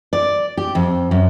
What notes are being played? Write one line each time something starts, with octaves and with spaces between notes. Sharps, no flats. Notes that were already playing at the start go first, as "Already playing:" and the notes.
D5
G4
F2
F#2